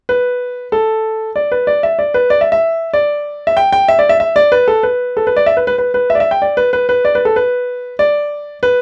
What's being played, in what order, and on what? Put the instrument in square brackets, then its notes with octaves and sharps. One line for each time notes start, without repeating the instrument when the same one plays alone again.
[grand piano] B4
A4
D5
B4
D5
E5
D5
B4
D5
E5
E5
D5
E5
G5
G5
E5
D5
E5
E5
D5
B4
A4
B4
A4
B4
D5
E5
B4
B4
B4
B4
E5
D5
E5
G5
D5
B4
B4
B4
D5
B4
A4
B4
D5
B4